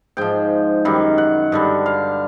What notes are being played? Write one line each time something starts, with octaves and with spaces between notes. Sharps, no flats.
G#2 F3 G5
F#2 D#3 G3
F#5
G2 D3 G3
F5